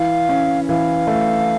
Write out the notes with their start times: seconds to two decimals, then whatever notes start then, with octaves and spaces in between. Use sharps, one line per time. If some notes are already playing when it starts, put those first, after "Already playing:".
Already playing: E3 F5
0.29 C#4
0.68 E3 F5
1.07 A3